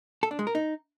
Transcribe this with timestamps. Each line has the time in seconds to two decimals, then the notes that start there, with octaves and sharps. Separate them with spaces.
0.23 A4
0.31 D4
0.39 G#3
0.47 A#4
0.55 D#4